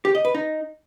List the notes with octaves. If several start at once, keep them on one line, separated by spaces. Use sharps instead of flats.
G4
D#5
B4
D#4